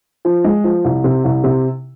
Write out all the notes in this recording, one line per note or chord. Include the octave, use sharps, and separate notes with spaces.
F3
G#3
F3
C2
C3
C2
C3